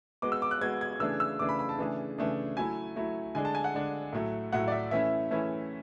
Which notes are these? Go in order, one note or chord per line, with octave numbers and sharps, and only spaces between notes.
G#3 B3 F#4 D6
E6
D6
F#6
G#3 B3 F#4 G#6
G#6
C#3 E3 A3 D4 G#4 E6
E6
C#3 E3 A3 D4 G#4 D6
B5
B5
A5
C#3 E3 A3 D4 G#4
C#3 E3 A3 D4 G#4
F#3 A3 E4 G#5
F#3 A3 E4
D3 G#3 D4 G#5
A5
G#5
F#5
D3 G#3 D4
A2 F#3 A3
A2 F#3 A3 F#5
D5
E5
E3 A3 C#4 E4 E5
E3 A3 C#4 E4